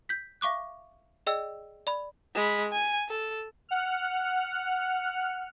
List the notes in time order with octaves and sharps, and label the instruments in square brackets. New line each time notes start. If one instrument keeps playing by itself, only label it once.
[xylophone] G6 B6
E5 F5 C#6 D6 F#6
G#4 D5 D#5 G5 E6
D5 B5
[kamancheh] G#3 B5
G#5
A4
[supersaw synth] F#5 F6